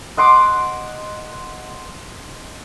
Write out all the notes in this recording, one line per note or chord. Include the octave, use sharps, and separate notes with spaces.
D#5 F#5 C6 D6